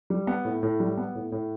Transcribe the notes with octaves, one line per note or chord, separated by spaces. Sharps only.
G3
B3
A2
A2
G3
B3
A2
A2